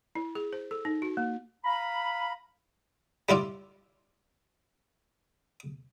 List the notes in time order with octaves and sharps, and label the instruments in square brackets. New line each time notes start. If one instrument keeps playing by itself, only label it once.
[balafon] E4
G#4
C5
A4
D#4
F#4
A#3
[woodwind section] F5 A#5 B5
[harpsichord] G3 E4 F4 D5